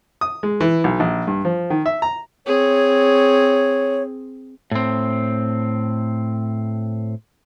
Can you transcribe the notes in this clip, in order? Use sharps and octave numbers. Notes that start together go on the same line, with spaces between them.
D#6
G#3
E3
B1
A#1
G2
F3
D#3
E5
A#5
C4 G#4 C#5
A2 C4